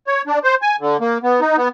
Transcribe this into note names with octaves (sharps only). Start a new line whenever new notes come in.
C#5
D4
C5
G#5
D3
A#3
B3
D#4
B3